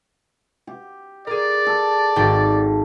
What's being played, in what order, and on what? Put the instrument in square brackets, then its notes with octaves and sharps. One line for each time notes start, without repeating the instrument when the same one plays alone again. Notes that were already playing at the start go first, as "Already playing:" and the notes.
[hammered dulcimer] G4
[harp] G#4 A#4 [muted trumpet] D5
[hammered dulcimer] A4
[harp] G#1 F#4 G5